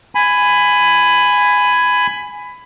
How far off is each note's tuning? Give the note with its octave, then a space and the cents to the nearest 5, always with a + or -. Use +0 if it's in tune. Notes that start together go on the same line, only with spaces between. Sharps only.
G#5 +0 B5 +15